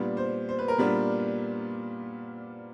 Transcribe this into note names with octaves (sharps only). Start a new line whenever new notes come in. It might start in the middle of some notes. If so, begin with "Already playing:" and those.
Already playing: A#2 G3 B3 D4
C5
C5
B4
A#4
A#2 G3 B3 D4 B4